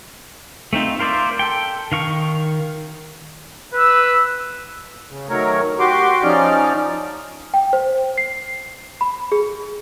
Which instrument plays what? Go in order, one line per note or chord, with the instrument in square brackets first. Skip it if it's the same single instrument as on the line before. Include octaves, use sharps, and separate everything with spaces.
[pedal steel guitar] A3 C4 D#4 F4
F4 A#4 C5 D5 E5
A4 G5
D#3 F5 C#6
[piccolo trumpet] B4 [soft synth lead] E6
[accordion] C#3
D#3 F#3 A3 A#4 C#5
F#4 G4 C6 D6
F3 C#4 D#4 D5 F6
[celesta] G5
C5
C7
B5
G#4